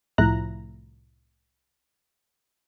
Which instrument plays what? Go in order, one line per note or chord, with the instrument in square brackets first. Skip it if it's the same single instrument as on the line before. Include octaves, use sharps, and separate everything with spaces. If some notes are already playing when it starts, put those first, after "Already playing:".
[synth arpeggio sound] C2 A2 F3 E4 A#5 F#6